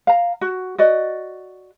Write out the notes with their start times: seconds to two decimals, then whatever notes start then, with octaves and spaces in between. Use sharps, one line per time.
0.07 F5 A#5
0.41 F#4
0.78 F#4 D5 D#5